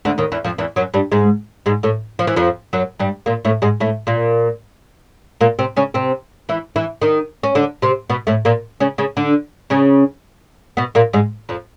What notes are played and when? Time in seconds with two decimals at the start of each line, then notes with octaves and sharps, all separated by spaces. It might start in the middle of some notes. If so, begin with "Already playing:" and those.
0.05 D2 D3
0.18 D#2 D#3
0.32 E2 E3
0.44 F2 F3
0.58 E2 E3
0.76 F#2 F#3
0.94 G2 G3
1.12 G#2 G#3
1.66 G#2 G#3
1.83 A2 A3
2.19 F3
2.27 E3
2.36 F2 F3
2.73 F#2 F#3
2.99 G2 G3
3.26 A#2 A#3
3.45 A2 A3
3.62 G#2 G#3
3.80 A2 A3
4.07 A#2 A#3
5.41 A#2 A#3
5.59 C3 C4
5.76 C#3 C#4
5.94 C3 C4
6.49 E3 E4
6.76 E3 E4
7.02 D#3 D#4
7.43 C#4
7.55 D3 D4
7.82 C3 C4
8.10 B2 B3
8.27 A2 A3
8.45 A#2 A#3
8.80 C#3 C#4
8.98 C#3 C#4
9.17 D3 D4
9.70 C#3 C#4
10.77 B2 B3
10.95 A#2 A#3
11.13 G#2 G#3
11.49 F2 F3